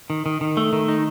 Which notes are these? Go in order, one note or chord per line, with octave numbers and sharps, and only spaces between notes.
D#3
D#3
D#3
A3
D#3
D#4